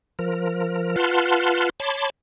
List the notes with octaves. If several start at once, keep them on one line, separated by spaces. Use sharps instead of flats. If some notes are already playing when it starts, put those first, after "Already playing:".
F3 A#4
F4 B4 F#5 A5 C6 F6
C#5 A5 B5 C6 D6